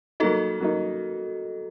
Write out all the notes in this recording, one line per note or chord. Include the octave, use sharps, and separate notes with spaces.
F#3 A#3 D#4 F#4 A4
F#3 A#3 D#4